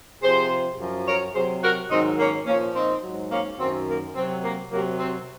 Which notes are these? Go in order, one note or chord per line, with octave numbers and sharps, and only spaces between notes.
C3 F3 G#4 C5
F#2 F3
A#4 C#5
C3 F#3 G#4 C5
F#4 A#4
G#2 D#3 F#3 C4 D#4
A#3 C#4
A#2 F3 A#3 C#4
C4 D#4
G#2 F#3
A#3 C#4
F#2 D#3 F#3 C4
A#3
C3 F#3 C4
A#3
C3 F#3 A#3
C4